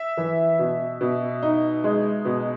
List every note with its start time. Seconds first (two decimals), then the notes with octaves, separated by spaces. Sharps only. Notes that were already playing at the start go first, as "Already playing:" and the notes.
Already playing: E5
0.17 E3
0.59 B2
1.01 B2
1.42 D#4
1.84 G#3
2.25 B2